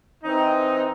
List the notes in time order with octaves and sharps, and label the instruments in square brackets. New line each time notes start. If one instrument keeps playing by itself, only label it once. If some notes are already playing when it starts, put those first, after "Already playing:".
[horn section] E3 C4 D#4